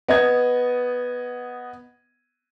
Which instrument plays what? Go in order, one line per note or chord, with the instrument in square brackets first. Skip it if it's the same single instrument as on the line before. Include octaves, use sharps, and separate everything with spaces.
[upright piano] B3 D#5 G#6